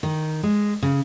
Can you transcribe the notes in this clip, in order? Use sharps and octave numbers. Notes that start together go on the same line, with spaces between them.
D#3
G#3
C#3